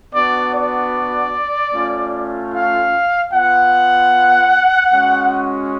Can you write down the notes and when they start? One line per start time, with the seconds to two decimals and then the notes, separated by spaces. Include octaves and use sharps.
0.14 B3 D4 F#4 D5
0.54 D5
1.74 A3 C#4 F4
2.54 F5
3.33 B3 F4 F#5
4.92 G#3 C#4 F#4